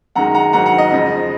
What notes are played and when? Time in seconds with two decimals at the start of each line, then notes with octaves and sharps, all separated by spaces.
0.15 F#2 D#3 G#3 F#5 A#5
0.35 F#5 A#5
0.53 G#2 D#3 F#3 F#5 A#5
0.66 F#5 A#5
0.78 D#5
0.91 F2 C#3 F3 G#3